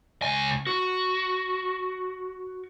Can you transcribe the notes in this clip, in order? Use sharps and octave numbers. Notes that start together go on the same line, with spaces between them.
C#2 G#5
F#4